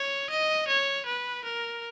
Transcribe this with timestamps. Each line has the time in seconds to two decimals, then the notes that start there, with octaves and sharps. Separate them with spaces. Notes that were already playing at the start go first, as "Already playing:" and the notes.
Already playing: C#5
0.30 D#5
0.68 C#5
1.06 B4
1.44 A#4